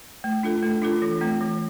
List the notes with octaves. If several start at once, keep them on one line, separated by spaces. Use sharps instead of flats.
A3
D4 F4 A4
A3
D4 F4 A4
E3
A3 C4
E3